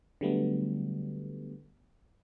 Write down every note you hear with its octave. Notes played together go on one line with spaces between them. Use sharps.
D3 F#3 G3 A3 B3